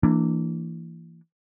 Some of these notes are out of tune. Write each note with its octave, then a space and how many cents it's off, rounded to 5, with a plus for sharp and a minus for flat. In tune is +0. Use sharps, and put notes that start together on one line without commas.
E3 +15 A#3 -25 D4 +0